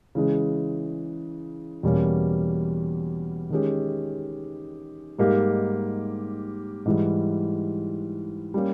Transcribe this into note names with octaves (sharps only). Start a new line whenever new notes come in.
C#3 E3 G#3
E2 B2 G3 A#3 C#4
D#3 G#3 C#4 G4
G#2 G3 A#3 D#4 G4
G#2 E3 G3
G3 A#3 C#4 G4